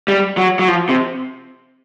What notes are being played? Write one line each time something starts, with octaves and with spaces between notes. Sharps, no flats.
G3
F#3
F#3
F3
C3